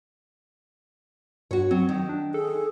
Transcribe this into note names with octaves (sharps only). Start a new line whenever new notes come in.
G2 F#4 C#5
F#3 C4
D#3
D4
G#4 A4